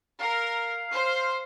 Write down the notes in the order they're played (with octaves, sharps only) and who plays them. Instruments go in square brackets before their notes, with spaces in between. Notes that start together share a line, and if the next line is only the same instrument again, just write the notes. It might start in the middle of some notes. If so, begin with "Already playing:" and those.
[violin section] A#4 [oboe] F5
[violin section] C5